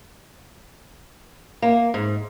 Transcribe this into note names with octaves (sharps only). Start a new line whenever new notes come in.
A#3
G#2